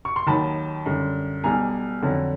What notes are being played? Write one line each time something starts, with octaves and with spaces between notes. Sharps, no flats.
C#6
C6
D#2 D#3 F#3 A5 B5
F#2 D3 G3
B1 B2 G3 G#5 A#5
F2 D3 F#3